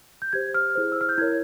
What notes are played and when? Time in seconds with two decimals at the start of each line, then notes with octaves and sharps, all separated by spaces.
0.22 G6
0.33 G4 C5 G#6
0.54 F6
0.75 E4 G#4 C5
0.92 E6
1.01 F6
1.09 G6
1.18 E4 A#4 C#5 G#6